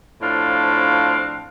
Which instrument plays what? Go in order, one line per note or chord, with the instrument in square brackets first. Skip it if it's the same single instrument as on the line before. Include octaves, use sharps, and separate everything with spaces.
[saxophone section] A2 F3 C4 D4 F5